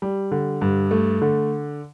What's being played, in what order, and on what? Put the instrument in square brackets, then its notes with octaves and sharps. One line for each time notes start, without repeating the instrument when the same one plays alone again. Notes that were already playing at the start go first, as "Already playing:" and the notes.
[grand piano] G3
D3
G2
A3
D3